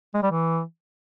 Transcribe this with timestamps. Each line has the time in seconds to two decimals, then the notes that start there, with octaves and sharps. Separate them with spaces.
0.14 G#3
0.23 G3
0.31 E3